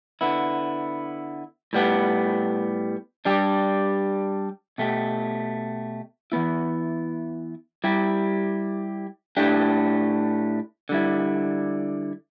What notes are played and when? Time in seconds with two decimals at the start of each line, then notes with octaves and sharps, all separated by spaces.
0.21 D3 B3 E4
1.73 A2 G3 B3 G4
3.25 G3 D4 G4
4.78 B2 A3 G4
6.32 E3 B3 E4
7.84 G3 E4 G4
9.37 A2 A3 D4 G4
10.89 D3 G3 E4